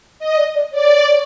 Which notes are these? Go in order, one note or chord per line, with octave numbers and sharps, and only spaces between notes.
D#5
D5
D5
C#5 D5